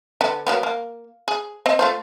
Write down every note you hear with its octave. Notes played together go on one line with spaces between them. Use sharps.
D3 B3
F#3 A#3 B3
A#3
G#4
C4 D#5
A3 F4 C5